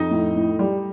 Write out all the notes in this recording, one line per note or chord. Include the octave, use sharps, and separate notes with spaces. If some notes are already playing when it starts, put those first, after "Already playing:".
Already playing: F2 D#4 D#5
A2
A2
G3